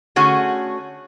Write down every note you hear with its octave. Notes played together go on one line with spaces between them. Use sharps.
D3 A3 C#4 F#4 G#4